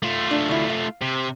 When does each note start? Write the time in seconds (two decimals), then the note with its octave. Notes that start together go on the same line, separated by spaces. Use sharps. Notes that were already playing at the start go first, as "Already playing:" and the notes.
0.03 A3 F4
0.31 D4
0.48 D2 E4
0.70 F5
1.01 C3